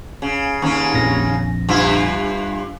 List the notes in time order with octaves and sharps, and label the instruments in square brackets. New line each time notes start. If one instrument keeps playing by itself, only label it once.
[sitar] C#3
D#2 C#3 C#4
[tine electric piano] A#1 F2 A#6
[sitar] G2 E4 F4